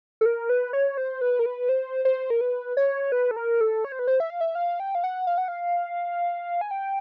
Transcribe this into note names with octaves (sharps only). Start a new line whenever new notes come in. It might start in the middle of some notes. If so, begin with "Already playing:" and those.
A4
A#4
B4
C#5
C5
B4
A#4
B4
C5
C5
A#4
B4
C#5
B4
A4
A#4
A4
C#5
C5
B4
C5
E5
F5
E5
F5
G5
F5
F#5
F5
F#5
F5
G#5
G5